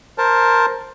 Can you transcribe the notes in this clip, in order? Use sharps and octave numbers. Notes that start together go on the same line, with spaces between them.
A#4 C5 A5